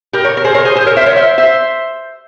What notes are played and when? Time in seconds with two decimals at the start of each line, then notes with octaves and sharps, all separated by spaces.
0.13 G4 A#4
0.24 A#4 C#5
0.37 A#4
0.44 G#4 C5
0.55 A#4 C#5
0.65 G#4 C5
0.75 G#4 C5
0.86 A#4 C#5
0.96 C5 E5
1.06 A#4 C#5
1.17 C5 E5
1.38 C5 E5